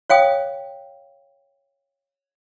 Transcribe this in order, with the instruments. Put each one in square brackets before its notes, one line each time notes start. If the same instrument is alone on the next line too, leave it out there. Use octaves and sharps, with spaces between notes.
[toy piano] C#5 F5 G5 D#6